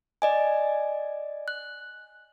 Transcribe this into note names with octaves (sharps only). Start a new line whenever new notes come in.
D5 D#5 G#5
F#6